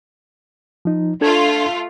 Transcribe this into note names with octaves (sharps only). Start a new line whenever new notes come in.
F3 D#4
A3 D4 F4 A4 G#6